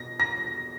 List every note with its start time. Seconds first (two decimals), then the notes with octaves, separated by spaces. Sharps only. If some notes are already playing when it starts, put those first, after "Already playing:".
Already playing: B2 A#6
0.20 A#6